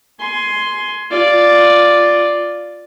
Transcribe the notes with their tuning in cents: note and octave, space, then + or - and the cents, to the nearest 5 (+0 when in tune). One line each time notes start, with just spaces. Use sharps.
G#5 +15 C6 +0
F4 +0 D5 +0